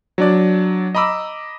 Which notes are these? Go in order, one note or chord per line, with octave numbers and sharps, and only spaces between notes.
F#3 D4 D5
D#5 A#5 B5 D6 E6